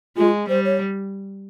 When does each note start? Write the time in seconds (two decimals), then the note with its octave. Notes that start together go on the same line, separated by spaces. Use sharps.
0.17 G#3 F4
0.49 G3 C5
0.65 C#5